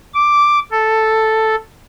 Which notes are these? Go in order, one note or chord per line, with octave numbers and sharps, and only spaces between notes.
D6
A4